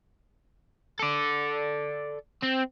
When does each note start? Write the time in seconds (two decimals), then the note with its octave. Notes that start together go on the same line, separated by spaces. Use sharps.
0.99 A4 D5
2.42 C4